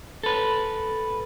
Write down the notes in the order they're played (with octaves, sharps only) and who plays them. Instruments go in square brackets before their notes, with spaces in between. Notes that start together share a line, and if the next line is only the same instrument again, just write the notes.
[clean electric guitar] A4 B4